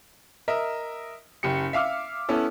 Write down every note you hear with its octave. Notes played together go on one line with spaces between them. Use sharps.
A#4 D#5 E5
F#1 G4 C#7
E5 F5 D6 F6
B3 C#4 E4 A4